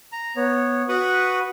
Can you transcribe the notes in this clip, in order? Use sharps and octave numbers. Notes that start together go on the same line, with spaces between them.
A#5
B3 C#5
F#4 B4 F#5 B5 C#6 D#6